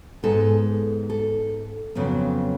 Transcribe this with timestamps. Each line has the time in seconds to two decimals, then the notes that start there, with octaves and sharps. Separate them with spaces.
0.23 G#2 G#3 B3 A4
1.10 A4
1.95 F2 C#3 F#3 B3